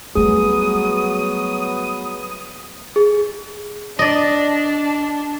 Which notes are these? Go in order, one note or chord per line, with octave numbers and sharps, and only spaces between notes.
F#3 G3 A3 B3 G#4 D#6
G#4
D4 D5 D#5